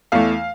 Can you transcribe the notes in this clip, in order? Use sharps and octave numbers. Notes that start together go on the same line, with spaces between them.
E2 E3 A3 F5